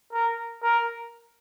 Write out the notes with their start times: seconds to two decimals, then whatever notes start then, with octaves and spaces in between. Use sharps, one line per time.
0.13 A#4
0.63 A#4